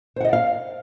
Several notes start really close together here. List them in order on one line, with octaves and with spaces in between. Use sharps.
C5 F#5 D#5 D5 F5